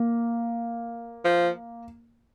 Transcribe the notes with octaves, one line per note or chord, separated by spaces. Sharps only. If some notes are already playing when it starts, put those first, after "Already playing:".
Already playing: A#3
F3